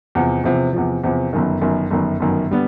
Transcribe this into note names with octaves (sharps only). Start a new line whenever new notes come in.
E2 C3 F3
E2 C3 F3
E2 C3 F3
E2 C3 F3
G1 F#2 D#3
G1 F#2 D#3
G1 F#2 D#3
G1 F#2 D#3
D3 G3 B3